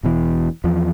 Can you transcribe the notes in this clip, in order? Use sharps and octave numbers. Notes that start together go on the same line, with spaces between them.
E1 B2 E3
E2 F3